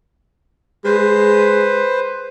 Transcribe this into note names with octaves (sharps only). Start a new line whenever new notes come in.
G#3 B4 C5